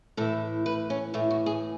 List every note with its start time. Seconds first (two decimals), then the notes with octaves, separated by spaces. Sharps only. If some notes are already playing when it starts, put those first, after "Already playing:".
0.17 A2 E3 A4
0.66 B4
0.90 C#4
1.14 A2 E3 A3
1.31 F#4
1.46 G#4